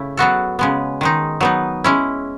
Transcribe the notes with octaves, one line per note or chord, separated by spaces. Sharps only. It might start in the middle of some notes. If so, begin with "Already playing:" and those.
Already playing: C#3 A3 E4
F#3 B3 F#4 A4
C#3 G#3 B3
D#3 G#3 D#4
F#3 B3 D#4
G#3 C#4 E4